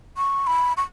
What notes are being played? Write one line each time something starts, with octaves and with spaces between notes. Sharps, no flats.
C#6
B5
C#6